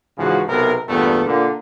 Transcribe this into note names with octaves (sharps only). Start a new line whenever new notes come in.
G#2 C#3 E3 F3 F#4 G#4
B1 C3 B3 A#4
E2 G2 A#2 A3 B3
A#2 D3 A#3